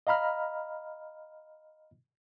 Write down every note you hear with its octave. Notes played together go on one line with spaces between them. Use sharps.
D#5 F5 A#5 B5 F6